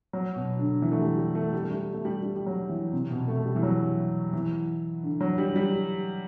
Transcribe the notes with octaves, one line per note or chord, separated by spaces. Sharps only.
F#3
B2
D3
E3
A3
G3
G3
A3
G3
A3
G3
A3
G3
G3
G3
F#3
E3
C3
B2
A3
G3
E3
F#3
E3
D3
F#3
G3
G3